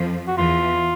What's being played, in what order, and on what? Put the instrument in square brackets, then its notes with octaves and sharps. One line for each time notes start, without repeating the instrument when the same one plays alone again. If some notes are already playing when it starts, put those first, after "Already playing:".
Already playing: [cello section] F2 F3
[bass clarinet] F#4
[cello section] E2 E3 [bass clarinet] F4